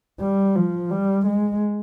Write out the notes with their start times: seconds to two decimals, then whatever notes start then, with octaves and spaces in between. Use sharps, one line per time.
0.21 G3
0.56 F3
0.91 G3
1.26 G#3